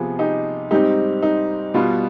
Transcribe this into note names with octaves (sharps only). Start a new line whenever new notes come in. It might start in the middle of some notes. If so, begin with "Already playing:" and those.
Already playing: C3 F3 B3 F4 G#4
D#4 G4
G#2 G3 C4 D#4 G4
D#4
B2 G3 B3 F4